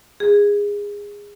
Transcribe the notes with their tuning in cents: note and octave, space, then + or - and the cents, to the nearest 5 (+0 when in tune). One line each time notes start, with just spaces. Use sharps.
G#4 -20